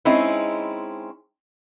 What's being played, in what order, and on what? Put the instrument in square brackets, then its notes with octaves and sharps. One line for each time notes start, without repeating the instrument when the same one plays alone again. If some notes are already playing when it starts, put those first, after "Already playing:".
[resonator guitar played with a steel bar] G#3 C4 C#4 D#4 E4